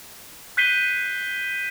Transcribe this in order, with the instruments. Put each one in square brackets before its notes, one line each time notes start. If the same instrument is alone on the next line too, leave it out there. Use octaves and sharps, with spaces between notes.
[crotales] F#6 G6 B6 C7 D#7 G7